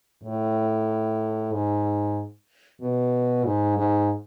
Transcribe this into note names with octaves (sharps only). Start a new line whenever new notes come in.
A2
G#2
B2
G#2
G#2